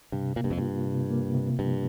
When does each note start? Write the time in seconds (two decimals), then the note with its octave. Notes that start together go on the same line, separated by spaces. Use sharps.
0.12 G2 C3
0.36 A#2 A#3
0.44 G2
0.51 F2
0.58 G2 F4
0.86 C3
1.10 A#3
1.34 C3
1.59 G2 F3